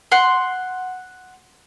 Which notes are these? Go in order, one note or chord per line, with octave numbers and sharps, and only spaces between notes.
F#5 C6